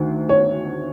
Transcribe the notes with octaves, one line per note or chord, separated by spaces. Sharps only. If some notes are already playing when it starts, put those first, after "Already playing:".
Already playing: D2 D#3
C#5